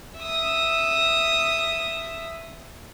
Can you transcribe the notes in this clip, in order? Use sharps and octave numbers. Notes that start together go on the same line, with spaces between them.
E5 D#6